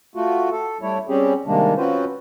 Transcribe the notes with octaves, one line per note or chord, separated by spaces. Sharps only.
A3 F4 F#4
A4
G3 A3 D4 E4 C#5
G3 C4 C#4 G4 G#4
C3 D#3 G3 G#3 A#3 D4
C4 C#4 F4 F#4 B4 C5